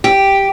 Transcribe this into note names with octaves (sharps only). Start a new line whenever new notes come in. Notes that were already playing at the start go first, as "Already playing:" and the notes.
G4